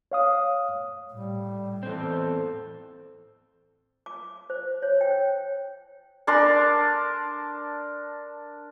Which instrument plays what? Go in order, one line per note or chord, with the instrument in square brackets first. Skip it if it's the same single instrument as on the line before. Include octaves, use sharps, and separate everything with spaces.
[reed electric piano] C#5 F5 D#6
[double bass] A2 [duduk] G3
[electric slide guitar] E2 C4 [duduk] A4
[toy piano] D6
C5
C#5
G5
[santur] D4 A#4 A5 C6